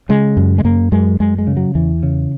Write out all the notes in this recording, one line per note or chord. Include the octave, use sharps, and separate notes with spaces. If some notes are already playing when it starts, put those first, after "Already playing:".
C#3 G#3
F#2
G#3
F#2 A#3
F#2 G#3
F#2 G#3
G#3
C#3
F#3
E2 E3
C#3